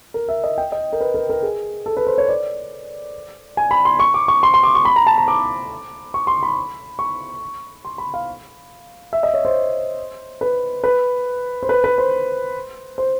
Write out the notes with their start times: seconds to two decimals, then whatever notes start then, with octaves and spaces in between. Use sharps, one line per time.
0.14 A#4
0.29 E5
0.44 D#5
0.58 G5
0.72 D#5
0.93 A#4
1.01 B4
1.14 A#4
1.30 A#4
1.43 G#4
1.86 A4
1.97 B4
2.07 C5
2.18 C#5
2.28 D5
3.57 G#5
3.71 B5
3.85 C6
4.00 C#6
4.14 D6
4.28 C#6
4.43 C6
4.54 C6
4.63 D6
4.75 C#6
4.85 B5
4.96 A#5
5.07 A5
5.18 A#5
5.28 D6
6.14 C#6
6.27 C6
6.43 B5
6.99 C#6
7.85 C6
7.98 B5
8.14 F5
9.13 E5
9.23 D#5
9.34 C#5
9.45 C5
10.41 B4
10.84 B4
11.63 C5
11.69 B4
11.84 B4
11.98 C5
12.98 C5